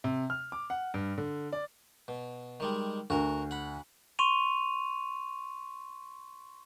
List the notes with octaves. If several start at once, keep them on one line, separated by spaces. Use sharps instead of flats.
C3
F6
D6
F#5
G2
D3
D5
B2
D#3 G3 G#3
D2 F#4 A#4
F#5 B5
C6 C#6 D#7 F7